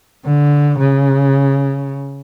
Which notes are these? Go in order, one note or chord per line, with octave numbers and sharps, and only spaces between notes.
D3
C#3